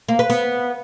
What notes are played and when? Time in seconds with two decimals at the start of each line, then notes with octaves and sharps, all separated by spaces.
0.08 A#3
0.19 B4
0.30 B3